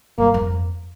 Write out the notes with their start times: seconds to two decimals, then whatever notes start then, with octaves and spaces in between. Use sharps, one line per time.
0.18 G2 A#3
0.34 F2